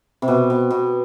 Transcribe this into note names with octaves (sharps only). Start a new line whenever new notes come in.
C3
B2
B2
B2